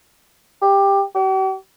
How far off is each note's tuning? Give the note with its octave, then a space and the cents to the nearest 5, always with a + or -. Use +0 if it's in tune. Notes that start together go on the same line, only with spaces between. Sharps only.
G4 +15
G4 -45